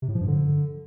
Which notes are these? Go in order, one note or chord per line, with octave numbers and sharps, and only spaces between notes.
C3
A2
F3
G2
D3